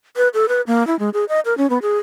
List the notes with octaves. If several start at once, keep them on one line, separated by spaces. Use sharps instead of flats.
B4
A4
B4
A#3
E4
G#3
G#4
D#5
A#4
C#4
B3
G#4